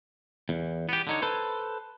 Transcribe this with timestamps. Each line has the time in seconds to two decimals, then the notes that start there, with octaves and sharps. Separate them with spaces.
0.49 E2
0.89 B3 G4
1.07 D3 D#4 C#5
1.22 A4 B4 C5